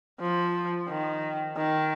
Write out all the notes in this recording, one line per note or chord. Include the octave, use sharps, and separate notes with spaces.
F3
D#3
D#3